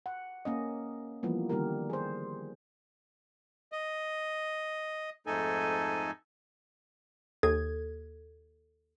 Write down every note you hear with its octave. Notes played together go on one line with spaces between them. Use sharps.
F#5
A#3 C#4 D#5
E3 F3 G3 A#3 B3
D3 D#3 G3 A#3 G4 A#4
G#4 C5
D#5
F2 G#2 A3 D#4 A4 G#5
D#2 A4 G#6